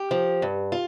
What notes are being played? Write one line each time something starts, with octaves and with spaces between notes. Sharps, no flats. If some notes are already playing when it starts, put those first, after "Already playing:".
Already playing: G4
F3
G2
F4